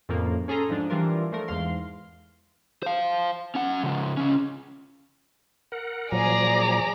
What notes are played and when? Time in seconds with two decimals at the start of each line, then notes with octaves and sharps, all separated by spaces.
0.09 F2 A2 C#3 F3 A#3
0.48 C#4 G#4 A4 A#5 C6
0.69 G#2 F3 D4
0.90 E3 G3 D4 F4 A#4
1.32 F3 A3 A#4
1.48 E2 G#2 F5 C6
2.83 C5 F5
3.55 C#4 F#5
3.83 C#3 F3
4.17 C#2 C#4
5.72 A#4 F#5
6.12 A#2 F3 F#3 G#4 D5 A#5